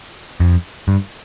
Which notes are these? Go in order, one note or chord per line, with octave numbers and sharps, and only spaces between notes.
F2
G2